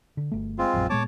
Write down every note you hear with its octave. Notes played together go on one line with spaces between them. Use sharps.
D3
G1 A3
G#3 C4 F4
D1 A#1 F#2
A#2 G#3 B3 C#5 A5 D6